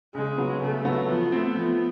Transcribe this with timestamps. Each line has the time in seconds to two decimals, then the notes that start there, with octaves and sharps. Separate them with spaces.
0.14 C#3 G#3
0.38 F#3 B3
0.61 C#3 A3
0.85 F#3 B3
1.08 F3 B3
1.32 A3 C4
1.55 F3